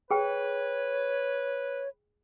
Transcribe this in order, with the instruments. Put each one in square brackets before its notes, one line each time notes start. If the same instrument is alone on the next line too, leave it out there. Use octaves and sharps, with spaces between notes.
[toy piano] G#4 G5 [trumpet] B4 [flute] C#5